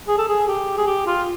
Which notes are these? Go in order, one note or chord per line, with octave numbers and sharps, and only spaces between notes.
G#4
A4
G#4
G4
G#4
G4
F4